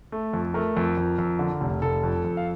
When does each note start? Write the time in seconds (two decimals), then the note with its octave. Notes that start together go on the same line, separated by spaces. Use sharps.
0.12 A3
0.33 F2
0.54 A3 A#4
0.77 F2
0.97 F2
1.18 F2
1.39 D3
1.61 F1
1.82 F1 A4
2.03 F2
2.25 F2
2.37 F5